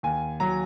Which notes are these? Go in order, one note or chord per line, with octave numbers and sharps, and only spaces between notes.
D#2 G#5
F#3 A#5